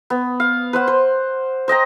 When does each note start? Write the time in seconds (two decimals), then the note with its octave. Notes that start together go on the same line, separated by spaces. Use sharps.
0.10 B3
0.40 F5
0.73 B4 C5 F#5
0.88 C5
1.68 C5 D#5 G5 A#5